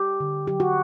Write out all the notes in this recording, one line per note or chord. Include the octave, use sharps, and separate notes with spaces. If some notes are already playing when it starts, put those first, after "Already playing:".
Already playing: G4
D3
F#3 G4
F#4